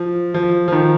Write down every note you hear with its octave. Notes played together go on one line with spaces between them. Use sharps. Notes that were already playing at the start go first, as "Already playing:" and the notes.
Already playing: F3
F3
F3
D#3